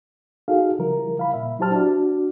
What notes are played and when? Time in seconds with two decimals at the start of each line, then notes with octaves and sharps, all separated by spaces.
0.48 D#4 F#4 G#4 A4 F5
0.79 C#3 F3 G3 E4 A#4
1.19 F5 B5
1.34 A#2 E5
1.59 F#3 E4 G4 C5 A5 F6
1.71 D4 F#4 D5